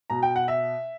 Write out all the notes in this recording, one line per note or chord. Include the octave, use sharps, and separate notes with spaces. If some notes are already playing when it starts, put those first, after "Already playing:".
B2 A#5
G5
F#5
E5